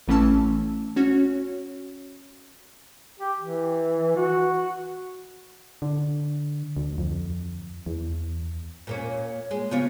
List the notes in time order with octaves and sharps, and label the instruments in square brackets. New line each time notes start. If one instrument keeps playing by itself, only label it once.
[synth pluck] A1 E3 A3 C#4 A5 E6
C#4 F#4 C#5
[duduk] G4
E3
F#4
[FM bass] D3
D2
F2
E2
[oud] A#2 A#3 C#4
[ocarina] C#5
[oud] G#3
[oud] C#3 F4 C#5 [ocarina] B3